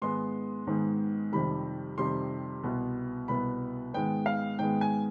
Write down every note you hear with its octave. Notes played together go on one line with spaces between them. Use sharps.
G#2 D#3 G#3 B3 C6
G#2 D#3 G#3 B3
F2 C3 D#3 G3 B5
F2 C3 D#3 G3 C6
C2 B2 B3
C2 B2 B3 B5
G#2 D#3 G#3 B3 G5
F5
G#2 D#3 G#3 B3 G5
G#5